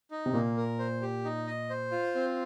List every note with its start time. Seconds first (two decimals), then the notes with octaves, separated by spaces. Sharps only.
0.11 D#4
0.26 C3
0.33 A#2 A#3
0.57 A#4
0.79 C5
1.02 G4
1.25 D#4
1.47 D#5
1.70 C5
1.92 F4
2.15 C4